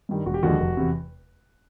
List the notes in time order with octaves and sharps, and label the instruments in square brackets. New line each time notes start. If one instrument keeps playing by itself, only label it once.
[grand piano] G2 D#3 G3
E1 F#4
G4
D#2 D3 F3 G#3 F#4
F1
E2 C3